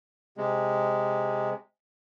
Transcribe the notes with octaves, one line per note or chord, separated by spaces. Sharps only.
C3 G#3